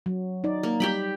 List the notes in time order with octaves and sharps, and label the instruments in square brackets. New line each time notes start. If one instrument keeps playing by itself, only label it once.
[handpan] F#3
D#4 D5
[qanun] A#3
[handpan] G3 [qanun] G4 G5 B5